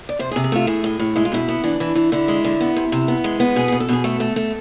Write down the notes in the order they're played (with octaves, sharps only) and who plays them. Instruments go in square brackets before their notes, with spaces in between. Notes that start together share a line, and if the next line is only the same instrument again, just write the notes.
[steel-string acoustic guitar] D5
C3 C5
G#4
C3
G#4
A3 F4
A2 G#4
A2
A2
G#3 E4
F4
B2 E4
B3
E3 D4
E3
E3
D3 E4
G#3
D3
B3
C3
C3
B3
G#3
B3
B2 G#4
B2 G#4
A4
B2 G#4
A3 A4
A3
A3